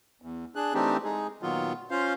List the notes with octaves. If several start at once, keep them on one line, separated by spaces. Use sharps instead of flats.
E2
D4 G#4 F#6
E3 A3 C4 D4 D#4 G4
G#3 D#4 G#4
A#2 D#3 F#3 B3 F4
C#4 F4 C5 F5